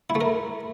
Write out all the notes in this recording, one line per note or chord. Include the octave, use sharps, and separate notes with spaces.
E4
A3
A#4